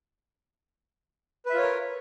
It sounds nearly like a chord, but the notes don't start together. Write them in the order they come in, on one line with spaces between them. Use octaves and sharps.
B4 E5 F4 C#5 A#4